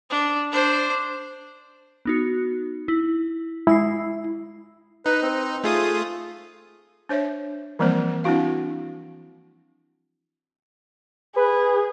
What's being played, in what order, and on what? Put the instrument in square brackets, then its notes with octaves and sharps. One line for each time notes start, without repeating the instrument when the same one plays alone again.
[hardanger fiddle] D4
D4 C5
[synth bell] B3 D#4 F#4
E4
[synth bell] G#3 E6 C7 [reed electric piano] E4
[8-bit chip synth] D#4 [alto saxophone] B4
[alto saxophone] C4
[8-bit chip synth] A3 F4 D#6 [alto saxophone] G#4
[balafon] D4 C5 C#5 E5
E3 F3 G3 A#3 C4 C5
C4 D4 E4 F#4 F5
[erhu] G#4 [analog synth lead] B4